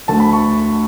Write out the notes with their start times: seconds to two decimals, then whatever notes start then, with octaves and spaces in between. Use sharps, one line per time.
0.08 D2 D3 A3 A5
0.20 B5
0.33 C#6